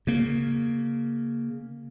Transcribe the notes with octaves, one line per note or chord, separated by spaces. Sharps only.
C#3 A#3